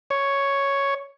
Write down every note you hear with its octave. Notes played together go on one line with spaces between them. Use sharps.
C#5